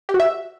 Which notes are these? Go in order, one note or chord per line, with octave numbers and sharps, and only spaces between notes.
G4
F#4
E5